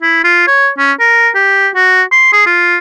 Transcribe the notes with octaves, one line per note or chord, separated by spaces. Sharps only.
E4
F4
C#5
C#4
A#4
G4
F#4
C6
G#4
F4